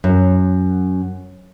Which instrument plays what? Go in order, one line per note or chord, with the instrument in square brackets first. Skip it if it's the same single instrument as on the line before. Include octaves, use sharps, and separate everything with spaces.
[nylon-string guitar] F#2